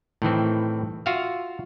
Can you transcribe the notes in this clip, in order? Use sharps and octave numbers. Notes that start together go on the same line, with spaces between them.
A2 D#3 E3 C4
F4 F#4 E5 F5